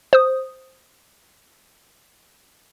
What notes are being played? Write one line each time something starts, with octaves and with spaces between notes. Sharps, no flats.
C5 D#6